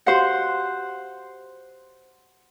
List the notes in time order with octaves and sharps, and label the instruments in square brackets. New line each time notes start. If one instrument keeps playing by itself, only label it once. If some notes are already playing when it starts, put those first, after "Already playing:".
[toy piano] F#4 G4 F5 [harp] C5 F#5